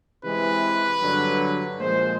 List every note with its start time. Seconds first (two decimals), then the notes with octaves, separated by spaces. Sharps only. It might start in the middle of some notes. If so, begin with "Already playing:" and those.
0.22 C3 E3 G#3 B4
1.01 G2 D3 F#3
1.80 A#2 F3 G#3 C5